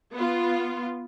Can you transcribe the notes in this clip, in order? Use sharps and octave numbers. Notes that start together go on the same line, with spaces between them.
B3 F4